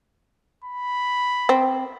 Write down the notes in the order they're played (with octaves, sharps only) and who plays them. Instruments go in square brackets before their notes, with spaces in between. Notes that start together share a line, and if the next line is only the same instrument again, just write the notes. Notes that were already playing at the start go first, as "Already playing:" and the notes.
[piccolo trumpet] B5
[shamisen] C4